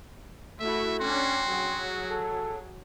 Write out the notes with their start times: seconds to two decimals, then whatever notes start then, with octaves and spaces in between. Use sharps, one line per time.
0.60 A3 E4 F#4 E5
1.00 C#4 D4 F#4 G5 C6
1.48 F#3 G#4
2.08 A4